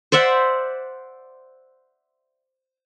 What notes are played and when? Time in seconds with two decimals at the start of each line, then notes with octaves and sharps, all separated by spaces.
0.12 C5 D5 E5 F#5